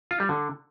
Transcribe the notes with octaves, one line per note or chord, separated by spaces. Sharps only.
F4
G3
D3